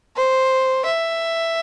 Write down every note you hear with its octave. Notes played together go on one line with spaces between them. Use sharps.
C5
E5